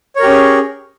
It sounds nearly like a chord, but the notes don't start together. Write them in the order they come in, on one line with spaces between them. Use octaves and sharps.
C#5 A#4 G4 C#4 G#4